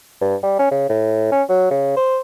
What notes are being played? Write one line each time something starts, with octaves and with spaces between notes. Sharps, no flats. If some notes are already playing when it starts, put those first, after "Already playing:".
G2
G3
C#4
C#3
A2
C#4
F#3
C#3
C5